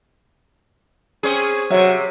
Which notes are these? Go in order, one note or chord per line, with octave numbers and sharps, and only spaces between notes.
C4 C#4 G#4
C3 F#3 E5